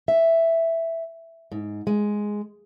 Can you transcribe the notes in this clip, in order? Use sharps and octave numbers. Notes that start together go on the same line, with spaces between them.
E5
G#2
G#3